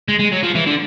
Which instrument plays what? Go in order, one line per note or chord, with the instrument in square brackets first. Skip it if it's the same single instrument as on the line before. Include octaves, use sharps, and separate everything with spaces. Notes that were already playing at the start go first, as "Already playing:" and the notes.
[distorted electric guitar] G#3
G#3
F#3
F3
E3
D3